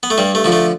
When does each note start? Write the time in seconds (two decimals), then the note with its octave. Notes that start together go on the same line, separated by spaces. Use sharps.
0.03 B3
0.10 A3
0.18 G2 G3
0.35 A3
0.44 D3 F3
0.52 A3